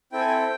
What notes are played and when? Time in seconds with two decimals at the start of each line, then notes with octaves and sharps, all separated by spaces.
0.12 C4 E4 A4 G5
0.20 G#5
0.27 G5